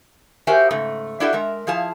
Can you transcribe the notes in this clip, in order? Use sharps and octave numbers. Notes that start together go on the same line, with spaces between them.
F#4 G4 A#4 C5 E5 G#5
G#2 C#3 A3
D4 E4 F#4 G4 A4 E5
G#3 A#4 E5
F3 E4 G#4 F5 A5